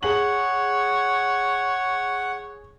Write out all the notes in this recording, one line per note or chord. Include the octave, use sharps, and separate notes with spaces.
G#4 C#5 F#5 F#7